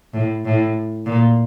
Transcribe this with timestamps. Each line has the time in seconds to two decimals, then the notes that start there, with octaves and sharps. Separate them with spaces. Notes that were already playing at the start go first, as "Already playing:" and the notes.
0.13 A2
0.45 A2
1.06 A#2